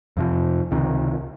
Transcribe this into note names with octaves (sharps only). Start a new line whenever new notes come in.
F2 C3 F3
C#2 C3 D#3